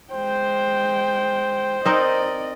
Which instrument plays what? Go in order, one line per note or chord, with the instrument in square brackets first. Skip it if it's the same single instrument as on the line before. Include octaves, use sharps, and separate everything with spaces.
[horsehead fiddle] G#3 G5 [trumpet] C5
[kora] C4 D#4 A#4 [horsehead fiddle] D5 D#5